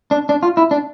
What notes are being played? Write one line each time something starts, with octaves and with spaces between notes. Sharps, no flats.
D4
D4
F4
E4
D4